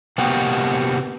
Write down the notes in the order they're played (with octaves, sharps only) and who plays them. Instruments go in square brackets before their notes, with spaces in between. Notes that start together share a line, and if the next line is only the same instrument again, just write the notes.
[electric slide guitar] C3 A#3 B3 F#4 G4